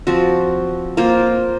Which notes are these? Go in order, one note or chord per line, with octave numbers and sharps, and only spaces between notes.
F3 C4 F#4
A#3 F4 C5